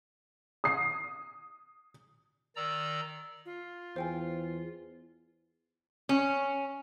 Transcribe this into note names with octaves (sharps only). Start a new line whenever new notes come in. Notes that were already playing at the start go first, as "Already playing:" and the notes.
D#6 C7
D#3 D5 A#5 E6
F4
E2 C5 G5 G#5
C#4